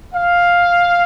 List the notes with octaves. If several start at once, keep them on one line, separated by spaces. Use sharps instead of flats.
F5